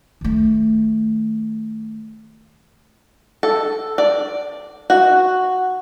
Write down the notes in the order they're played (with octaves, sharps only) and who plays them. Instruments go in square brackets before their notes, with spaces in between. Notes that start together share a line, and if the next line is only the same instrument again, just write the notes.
[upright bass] D#3 A3
[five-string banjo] A4
D5
F#4